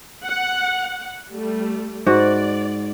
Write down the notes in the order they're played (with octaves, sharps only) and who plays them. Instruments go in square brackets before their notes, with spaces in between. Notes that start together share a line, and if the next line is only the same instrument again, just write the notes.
[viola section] F#5
G3 A3
[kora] G#2 F#4 [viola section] D5